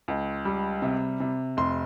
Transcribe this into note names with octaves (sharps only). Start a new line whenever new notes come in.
C#2
G3
C3
C3
F1 C6